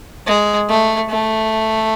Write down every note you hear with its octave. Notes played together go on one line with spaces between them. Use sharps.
G#3
A3
A3